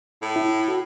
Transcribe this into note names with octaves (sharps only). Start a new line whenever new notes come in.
A2
E4
F#4